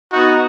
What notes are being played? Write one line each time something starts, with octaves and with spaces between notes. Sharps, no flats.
B3 D#4 F#4